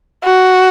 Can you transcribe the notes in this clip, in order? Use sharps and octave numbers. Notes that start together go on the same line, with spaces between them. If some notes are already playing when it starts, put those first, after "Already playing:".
F#4